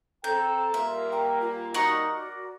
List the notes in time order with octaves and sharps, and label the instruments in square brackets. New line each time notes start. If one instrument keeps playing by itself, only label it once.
[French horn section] C4 A4 [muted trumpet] G5 [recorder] A#5 [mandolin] G6
[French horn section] A#2 G3 A#3 [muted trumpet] F4 [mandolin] E5
[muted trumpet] A#4 [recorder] G5
[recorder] F4
[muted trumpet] D#4 [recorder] F#4 [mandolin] A#4 F#5 C#6
[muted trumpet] D5